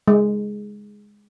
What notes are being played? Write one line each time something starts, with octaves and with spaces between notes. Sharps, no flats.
G#3